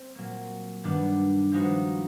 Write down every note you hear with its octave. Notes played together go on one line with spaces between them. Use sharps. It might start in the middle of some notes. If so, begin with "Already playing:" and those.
Already playing: C4
A#2 F#3 A#3
G2 D#3 G3 B3 D4
F3 G#3 B3 D#4 F#4